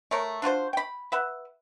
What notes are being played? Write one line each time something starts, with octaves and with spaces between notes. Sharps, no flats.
A3 A#4 C#5
D4 F4 F#4 C5
G5 B5
B4 E5 F#5